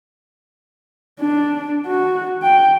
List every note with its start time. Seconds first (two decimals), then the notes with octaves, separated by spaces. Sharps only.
1.20 D4
1.86 F#4
2.43 G5